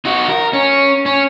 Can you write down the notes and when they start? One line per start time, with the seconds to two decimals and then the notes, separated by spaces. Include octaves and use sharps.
0.05 D#4 F#4
0.29 A#4
0.53 C#4
1.06 C#4